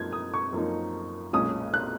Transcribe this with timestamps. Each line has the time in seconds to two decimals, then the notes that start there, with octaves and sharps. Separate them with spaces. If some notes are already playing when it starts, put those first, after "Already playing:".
Already playing: F#2 F3 A#3 D#4 G#6
0.13 D#6
0.34 C#6
0.53 F#2 F3 A#3 D#4
1.33 B1 A#2 G#3 C#4 D#6
1.74 F#6